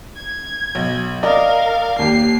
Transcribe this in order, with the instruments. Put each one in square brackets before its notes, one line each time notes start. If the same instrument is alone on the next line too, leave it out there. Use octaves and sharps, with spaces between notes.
[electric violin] G#6
[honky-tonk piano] B1
[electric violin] A#4 F5 [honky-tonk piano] D5 [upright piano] D#5
[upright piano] D#2 G4 [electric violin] C7